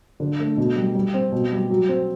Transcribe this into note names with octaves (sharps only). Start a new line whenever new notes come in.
D3
A3
B2
G3
G3
C4
B2
G3
F#3
C4